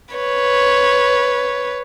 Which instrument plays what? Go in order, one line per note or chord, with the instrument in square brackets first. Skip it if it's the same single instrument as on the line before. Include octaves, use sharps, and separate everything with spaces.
[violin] B4 C#5